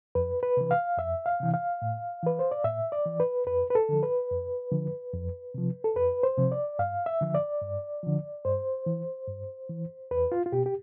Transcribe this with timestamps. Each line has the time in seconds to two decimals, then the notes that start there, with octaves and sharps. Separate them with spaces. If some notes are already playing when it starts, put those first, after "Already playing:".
0.15 F2 B4
0.43 B4
0.57 C3 E3
0.71 F5
0.98 F2 E5
1.26 F5
1.40 C3 E3
1.54 F5
1.82 A2
2.23 E3 B4
2.39 C5
2.51 D5
2.64 A2 E5
2.92 D5
3.06 E3
3.20 B4
3.47 F2 B4
3.70 B4
3.75 A4
3.89 D3 F3
4.03 B4
4.30 F2
4.71 D3 F3
5.13 F2
5.54 C3 F3
5.84 A4
5.96 F2 B4
6.23 C5
6.37 C3 F3
6.52 D5
6.79 G2 F5
7.06 E5
7.21 D3 F3
7.34 D5
7.62 G2
8.03 D3 F3
8.45 G2 C5
8.86 E3
9.28 G2
9.69 E3
10.11 E2 B4
10.32 F4
10.46 F4
10.52 B2 G4
10.66 G4